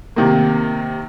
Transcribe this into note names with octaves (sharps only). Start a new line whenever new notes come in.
C3 D#3 A#3